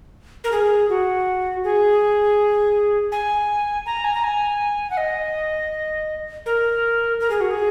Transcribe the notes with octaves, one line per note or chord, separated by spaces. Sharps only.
A#4
G#4
F#4
G#4
G#5
A#5
G#5
A#5
G#5
F#5
D#5
A#4
A#4
G#4
F#4
G#4